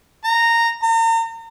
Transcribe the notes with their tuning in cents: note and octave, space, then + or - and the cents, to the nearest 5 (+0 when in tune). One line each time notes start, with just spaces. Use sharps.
A#5 -10
A#5 -40